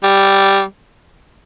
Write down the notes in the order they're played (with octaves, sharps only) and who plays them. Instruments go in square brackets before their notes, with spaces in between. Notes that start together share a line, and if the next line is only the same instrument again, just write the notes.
[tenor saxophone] G3